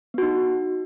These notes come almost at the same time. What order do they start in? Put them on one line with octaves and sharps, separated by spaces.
B3 F#4 D#4